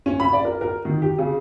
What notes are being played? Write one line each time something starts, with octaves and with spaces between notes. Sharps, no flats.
C#4
B5
D5
A#4
A#4
D#3
G4
C#3